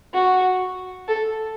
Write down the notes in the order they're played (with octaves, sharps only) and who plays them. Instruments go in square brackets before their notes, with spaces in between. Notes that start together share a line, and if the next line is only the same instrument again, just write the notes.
[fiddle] F#4
A4